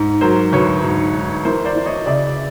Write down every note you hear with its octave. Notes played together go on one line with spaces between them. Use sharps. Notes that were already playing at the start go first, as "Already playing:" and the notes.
Already playing: G#2
F#3 A#4 C5
D2 B4 C#5
G#2
G#2
E3 A#4 C5
C5 D5
E3
C#5 D#5
C#3 D5 E5